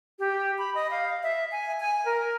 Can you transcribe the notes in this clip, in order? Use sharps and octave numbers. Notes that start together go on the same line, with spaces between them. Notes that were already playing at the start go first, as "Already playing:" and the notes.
G4
B5
D#5
F5
E5
G#5
G#5
A#4